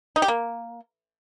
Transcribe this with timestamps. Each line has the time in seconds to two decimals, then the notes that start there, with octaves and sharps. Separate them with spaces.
0.16 D#4
0.22 G4
0.28 A#3